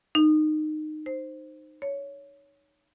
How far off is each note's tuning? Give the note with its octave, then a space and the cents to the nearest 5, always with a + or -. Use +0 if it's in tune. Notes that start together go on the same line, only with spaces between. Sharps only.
D#4 -20
C5 +0
C#5 +15